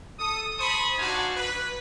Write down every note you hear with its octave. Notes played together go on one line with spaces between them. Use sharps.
A4 D#6
C5 A5 B5 C#6 D#6
D4 D#4 F#4 F5 G#5
B4